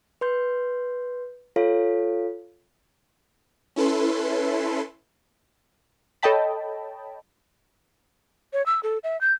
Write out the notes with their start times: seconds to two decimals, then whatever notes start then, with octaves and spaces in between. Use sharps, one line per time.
0.21 B4 C6 G6
1.56 F4 A4 C#5 F5
3.76 C#4 E4 A4 B4 C6
6.23 A4 C#5 D#5 G5 A5 B5
8.53 C#5
8.66 E6
8.83 A4
9.04 E5
9.21 G6